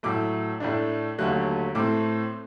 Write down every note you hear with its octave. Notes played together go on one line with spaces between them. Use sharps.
A2 F#3 A3 D6
A2 A3 D4
D#2 D3 F#3 A3 F#6
A2 A3 C4 D6